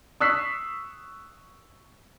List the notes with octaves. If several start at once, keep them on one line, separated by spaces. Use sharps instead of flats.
C#6 D#6 E6 F#6 B6 C7